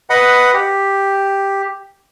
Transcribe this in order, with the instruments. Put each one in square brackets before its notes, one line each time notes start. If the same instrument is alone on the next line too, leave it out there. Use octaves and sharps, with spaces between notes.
[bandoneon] B4 D#5 F#5 B5
G4